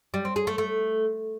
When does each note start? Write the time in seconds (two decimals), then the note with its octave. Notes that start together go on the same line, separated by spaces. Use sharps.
0.14 G3
0.25 C4
0.36 G#4
0.47 A3
0.58 A3